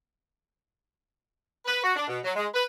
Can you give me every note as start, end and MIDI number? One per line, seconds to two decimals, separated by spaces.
1.65 1.81 71
1.83 1.95 66
1.96 2.06 62
2.08 2.18 47
2.24 2.31 54
2.36 2.47 56
2.54 2.63 71